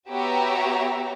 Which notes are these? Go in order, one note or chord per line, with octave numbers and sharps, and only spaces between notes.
B3 F#4 G4 C#5 E5 A#5